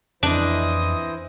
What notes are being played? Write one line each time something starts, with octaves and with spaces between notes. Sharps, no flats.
F2 E3 D4 E4 C5 D#5